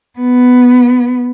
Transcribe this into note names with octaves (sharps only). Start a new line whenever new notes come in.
B3